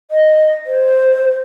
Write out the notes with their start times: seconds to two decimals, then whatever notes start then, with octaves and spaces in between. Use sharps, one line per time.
0.11 D#5
0.66 C5